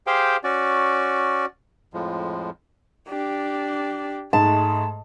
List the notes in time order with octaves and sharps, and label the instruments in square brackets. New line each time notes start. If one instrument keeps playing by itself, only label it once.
[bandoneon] G4 G#4 C5 F5 G5
C#4 F#4 D5
F2 A2 F3 G#3
[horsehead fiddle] D4 G4
[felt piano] G#2 [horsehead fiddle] G#3 A3 [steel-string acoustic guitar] A5